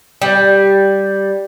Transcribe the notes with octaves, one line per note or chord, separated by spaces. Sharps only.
G3